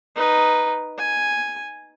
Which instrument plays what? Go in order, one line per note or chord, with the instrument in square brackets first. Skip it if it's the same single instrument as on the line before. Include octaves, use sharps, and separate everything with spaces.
[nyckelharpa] D#4 B4
G#5